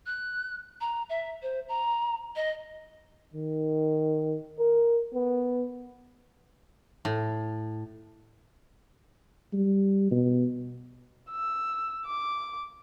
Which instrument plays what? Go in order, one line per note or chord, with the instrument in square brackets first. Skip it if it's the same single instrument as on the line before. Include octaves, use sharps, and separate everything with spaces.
[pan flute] F#6
A#5
E5
C5
A#5
D#5
[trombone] D#3
A#4
B3
[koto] A2
[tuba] G3
B2
[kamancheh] E6
D6